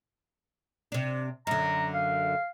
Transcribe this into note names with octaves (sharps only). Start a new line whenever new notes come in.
C3 D4
F#2 D3 A#5
F5